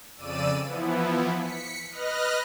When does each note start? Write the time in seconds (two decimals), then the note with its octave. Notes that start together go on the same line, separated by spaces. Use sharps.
0.17 F2 C#3 D5 E6 D#7
0.63 E3 F3 B3 E4
1.34 B6 C#7
1.90 B4 D#5 F6 F#6 A#6